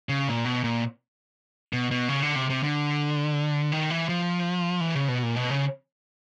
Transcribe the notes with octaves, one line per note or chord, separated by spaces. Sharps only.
C#3
A#2
B2
A#2
B2
B2
C#3
D3
C3
C3
D3
D#3
E3
F3
E3
C#3
B2
A#2
B2
C#3